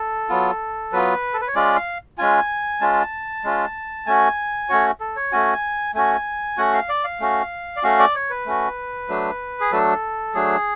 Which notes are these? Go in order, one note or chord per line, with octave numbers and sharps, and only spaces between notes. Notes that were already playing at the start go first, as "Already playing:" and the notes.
Already playing: A4
F#3 B3 F4
F#3 B3 F4 B4
A4
B4
C#5
G#3 C#4 F4 D5
F5
G#3 C#4 F4 G#5
G#3 C#4 F4 A5
G#3 C#4 F4
A3 C#4 F#4 G#5
A3 C#4 F#4 C#5
A4
C#5
A3 C#4 F#4 G#5
A3 C#4 F#4 G#5
A3 C#4 F#4 F#5
F5
D5
F5
A3 C#4 F#4
D5
A3 C#4 F#4 F5
D5
C#5
B4
A3 C#4 F#4
F#3 A3 D4
G#4
F#3 A3 D4 A4
F#3 A3 D4 G#4